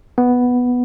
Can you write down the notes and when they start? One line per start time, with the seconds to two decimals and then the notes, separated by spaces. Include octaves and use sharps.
0.18 B3